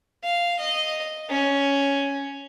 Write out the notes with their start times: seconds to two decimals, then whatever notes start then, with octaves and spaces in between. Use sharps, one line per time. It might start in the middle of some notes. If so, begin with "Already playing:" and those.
0.23 F5
0.59 D#5
1.30 C#4